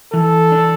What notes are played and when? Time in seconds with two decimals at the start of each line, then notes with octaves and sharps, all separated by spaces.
0.13 E3 A4
0.52 D4